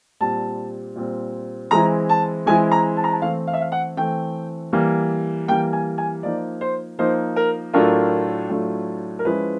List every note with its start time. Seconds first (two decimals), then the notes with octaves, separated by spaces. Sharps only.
0.20 A#2 G3 C4 A5
0.95 A#2 G3 C4
1.71 E3 G#3 C4 E4 A#5
2.09 A5
2.46 E3 G#3 C4 E4 G#5
2.71 A#5
2.97 A5
3.04 A#5
3.12 A5
3.22 E3 A3 C4 F5
3.47 F5
3.54 E5
3.61 F5
3.72 F#5
3.97 E3 A3 C4 G5
4.73 E3 G3 A#3
5.48 E3 G3 A#3 G5
5.73 G#5
5.98 G#5
6.23 F3 A#3 D#4 D5
6.61 C5
6.99 F3 A#3 D#4 C5
7.36 A#4
7.73 A2 F#3 A3 D4 F4 A#4
8.49 A2 F#3 A3 D4 F4
9.19 A#4
9.25 F3 G#3 C#4 E4 B4